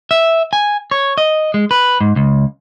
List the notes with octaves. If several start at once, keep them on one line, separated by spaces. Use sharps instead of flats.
E5
G#5
C#5
D#5
G#3
B4
G#2
C#2